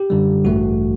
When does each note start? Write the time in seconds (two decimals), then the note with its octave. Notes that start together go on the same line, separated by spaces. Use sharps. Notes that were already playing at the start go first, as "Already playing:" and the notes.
Already playing: G4
0.10 F#2 D3 G3
0.45 A1 G2 E3 A3 F#4